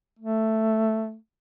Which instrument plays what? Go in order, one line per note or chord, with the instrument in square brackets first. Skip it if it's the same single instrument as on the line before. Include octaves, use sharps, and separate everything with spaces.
[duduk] A3